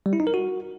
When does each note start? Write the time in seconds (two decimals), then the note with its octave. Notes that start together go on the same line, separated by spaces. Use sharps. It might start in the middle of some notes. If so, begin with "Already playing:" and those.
0.06 G3
0.13 E4
0.20 D#4
0.27 A#4
0.34 F#4